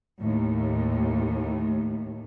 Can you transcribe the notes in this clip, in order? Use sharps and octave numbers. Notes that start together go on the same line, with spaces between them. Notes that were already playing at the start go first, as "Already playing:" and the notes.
D#2 A2